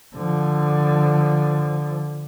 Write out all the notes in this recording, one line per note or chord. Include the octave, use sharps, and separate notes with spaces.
D3 F3